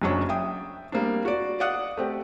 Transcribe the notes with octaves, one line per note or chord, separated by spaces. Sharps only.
F#1 F#2 F#3 C#4 D4 C#6
E5 G5 D#6
G3 A#3 C4 D4
F#4 D5
D5 D#5 F5 F#5 D#6 F#6
A3 C4 G4